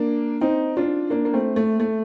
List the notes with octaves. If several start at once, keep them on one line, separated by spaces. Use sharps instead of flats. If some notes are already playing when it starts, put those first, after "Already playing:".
Already playing: A#3 D4
C4 D#4
D4 F4
A#3 D4
A#3
A3 C4
A3
A3